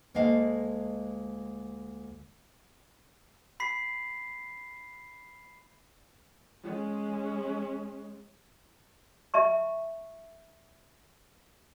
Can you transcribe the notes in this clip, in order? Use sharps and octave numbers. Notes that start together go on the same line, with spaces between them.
D2 G#3 A#3 D#5 F5 A5
B5 B6 C7
G#3 C#4
E5 A5 C#6